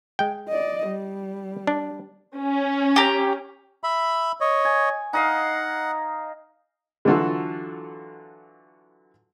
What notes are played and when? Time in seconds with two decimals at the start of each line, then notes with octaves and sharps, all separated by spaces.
0.19 G#3 G5
0.49 D5 D#5
0.87 G3
1.67 D4
2.37 C#4
2.96 G4 A#5
3.84 E5 B5
4.41 C#5 D#5
4.65 G#5
5.13 D#4 D#5 F5 F#5
7.05 D3 E3 F#3 F4 F#4 A4